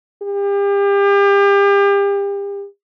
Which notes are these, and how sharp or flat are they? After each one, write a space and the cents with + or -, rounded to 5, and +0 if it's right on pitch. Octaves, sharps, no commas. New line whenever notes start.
G4 +35